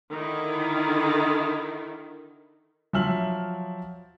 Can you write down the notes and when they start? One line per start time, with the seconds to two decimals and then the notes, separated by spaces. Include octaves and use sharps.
0.11 D3 D#3 E4
2.93 F3 F#3 E5 E6 F6 F#7